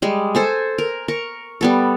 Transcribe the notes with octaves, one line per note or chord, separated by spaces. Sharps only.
G3 G#3
A4 C5 G#5
A#4
A#4 C#6
G3 B3 A4